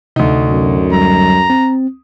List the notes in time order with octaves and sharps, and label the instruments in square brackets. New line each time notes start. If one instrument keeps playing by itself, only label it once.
[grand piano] D2 D#4 [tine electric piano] C3
[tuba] F#2
[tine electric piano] F#3 G3 [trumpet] A#5
[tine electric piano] C4